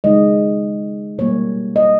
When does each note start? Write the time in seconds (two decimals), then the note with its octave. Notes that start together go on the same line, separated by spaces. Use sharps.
0.04 C#3 G#3 D#4 D#5
1.18 B2 G3 A#3 C#5
1.76 D#5